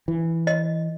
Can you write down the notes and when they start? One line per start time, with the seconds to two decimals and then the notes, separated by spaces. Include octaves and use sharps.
0.08 E3
0.47 D#5